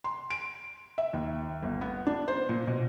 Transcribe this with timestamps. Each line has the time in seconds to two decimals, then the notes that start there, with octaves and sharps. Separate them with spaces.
0.04 C6
0.30 D7
0.98 E5
1.13 D#2
1.62 G1
1.81 B3
2.07 D4
2.28 C5
2.49 A#2
2.67 B2